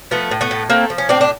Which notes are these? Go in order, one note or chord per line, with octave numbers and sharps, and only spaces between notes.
F3 A3 B3
A2
A3 B3
A2
A3 A#3 C4
F3
C#4
A2 C4 D4
D4